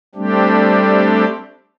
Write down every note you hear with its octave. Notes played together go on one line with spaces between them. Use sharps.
G3 A3 C4 D4 G4